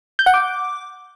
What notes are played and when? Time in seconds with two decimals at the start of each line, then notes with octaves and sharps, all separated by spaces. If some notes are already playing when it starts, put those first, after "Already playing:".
0.19 G6
0.26 F#5
0.34 D6